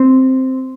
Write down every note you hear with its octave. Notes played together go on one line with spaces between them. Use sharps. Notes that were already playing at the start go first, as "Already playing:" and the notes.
Already playing: C4